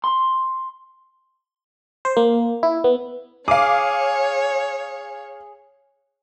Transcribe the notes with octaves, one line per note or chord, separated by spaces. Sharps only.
C6
C5
A#3
E4
B3
G#4 C#5 F5 D6